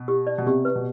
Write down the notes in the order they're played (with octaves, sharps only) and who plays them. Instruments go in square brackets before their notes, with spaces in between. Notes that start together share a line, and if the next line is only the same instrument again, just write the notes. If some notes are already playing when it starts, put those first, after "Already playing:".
Already playing: [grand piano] B2
[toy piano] G4
D5
[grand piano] B2
[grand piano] C3 [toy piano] G4
[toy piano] B4
[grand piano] B2